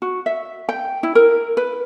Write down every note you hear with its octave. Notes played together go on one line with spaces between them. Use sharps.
F#4
E5
G5
E4
A#4
B4